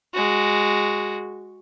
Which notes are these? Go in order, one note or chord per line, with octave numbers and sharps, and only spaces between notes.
G#3 F#4